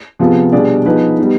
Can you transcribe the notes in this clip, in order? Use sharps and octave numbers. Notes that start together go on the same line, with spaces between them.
C3 F3 B3 F4 G#4
B2 G3 D4 G#4 D5
F3 B3 D#4 G#4 B4
G3 B3 D#4